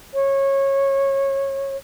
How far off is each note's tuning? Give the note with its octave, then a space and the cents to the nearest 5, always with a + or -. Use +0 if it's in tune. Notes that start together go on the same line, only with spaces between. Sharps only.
C#5 -20